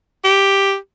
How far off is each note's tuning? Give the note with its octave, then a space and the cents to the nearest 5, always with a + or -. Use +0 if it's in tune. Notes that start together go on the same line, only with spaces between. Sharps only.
G4 +5